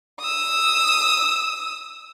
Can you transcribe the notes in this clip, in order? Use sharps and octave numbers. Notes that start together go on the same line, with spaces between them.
D#6 E6